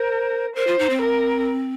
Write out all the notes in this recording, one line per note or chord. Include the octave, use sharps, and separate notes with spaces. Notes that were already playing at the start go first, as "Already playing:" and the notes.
Already playing: A#4 C5
A#4 C5
F4
D#4
C4
A#4